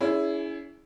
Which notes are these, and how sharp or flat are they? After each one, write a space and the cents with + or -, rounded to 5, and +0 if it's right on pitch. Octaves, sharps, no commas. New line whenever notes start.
C#4 +35 E4 +0 G#4 +0